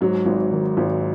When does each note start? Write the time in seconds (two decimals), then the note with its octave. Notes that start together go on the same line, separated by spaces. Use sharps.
0.01 G#2 F#3
0.26 G#1
0.51 D#3
0.77 G#1